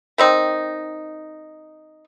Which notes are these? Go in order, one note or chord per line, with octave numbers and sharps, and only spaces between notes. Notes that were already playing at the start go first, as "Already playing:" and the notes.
D#3 C4 D#4